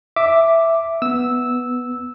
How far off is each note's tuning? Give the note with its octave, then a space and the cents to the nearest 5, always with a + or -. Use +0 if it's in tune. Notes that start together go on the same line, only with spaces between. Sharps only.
E5 +0 D6 +0
B3 +0 E6 -10